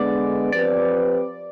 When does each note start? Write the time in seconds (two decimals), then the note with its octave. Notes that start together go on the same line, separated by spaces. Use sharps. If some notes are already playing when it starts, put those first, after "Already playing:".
Already playing: D3 G#3 B3 D5
0.52 F3 C4 G4 B4 D5